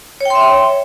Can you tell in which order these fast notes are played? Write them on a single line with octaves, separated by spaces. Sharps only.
C#5 G5 C6 E5